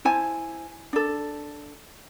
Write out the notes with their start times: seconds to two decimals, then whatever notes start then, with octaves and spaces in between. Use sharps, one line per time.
0.05 E4 C5 G#5 A5
0.93 D4 A4